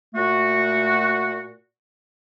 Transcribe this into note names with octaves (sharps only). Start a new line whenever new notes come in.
A#2 A3 F#4